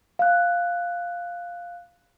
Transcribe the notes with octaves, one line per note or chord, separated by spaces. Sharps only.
F5 F#6